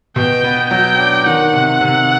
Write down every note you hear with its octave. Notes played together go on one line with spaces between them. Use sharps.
B2 G5
B3
F#3 G5
D4
D#3 F#5
C3
C3